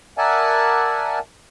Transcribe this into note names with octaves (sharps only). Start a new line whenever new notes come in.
A#4 D5 E5 F#5 G#5 A5